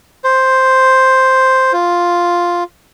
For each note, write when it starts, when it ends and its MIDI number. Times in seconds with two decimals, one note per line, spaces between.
0.24 1.73 72
1.73 2.64 65